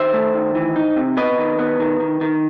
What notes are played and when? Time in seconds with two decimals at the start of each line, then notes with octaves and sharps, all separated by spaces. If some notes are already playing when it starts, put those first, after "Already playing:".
Already playing: D#3 C5 E5
0.13 A3
0.34 D#3
0.55 E3
0.76 D#4
0.96 C3
1.17 B3 B4 D#5
1.38 D#3
1.59 B3
1.80 D#3
2.00 D#3
2.21 D#3